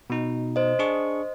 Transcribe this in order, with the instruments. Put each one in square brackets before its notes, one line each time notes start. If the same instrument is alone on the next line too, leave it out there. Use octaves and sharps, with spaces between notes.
[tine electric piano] B2 D#4
[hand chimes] C5 D#5
[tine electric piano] D4 G#4 C#6